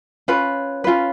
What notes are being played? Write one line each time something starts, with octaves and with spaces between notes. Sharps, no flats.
C#4 F4 B4
C#4 F4 B4